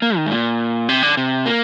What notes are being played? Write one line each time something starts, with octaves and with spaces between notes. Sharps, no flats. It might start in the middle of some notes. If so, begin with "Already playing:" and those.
A#3
D#3
G#2
A#2
C3
D3
C3
A#3